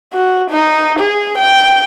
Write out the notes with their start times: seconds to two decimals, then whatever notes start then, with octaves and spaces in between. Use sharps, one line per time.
0.13 F#4
0.50 D#4
0.99 G#4
1.38 G5